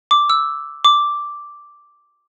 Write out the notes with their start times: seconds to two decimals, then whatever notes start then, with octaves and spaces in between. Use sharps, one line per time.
0.11 D6
0.30 E6
0.85 D6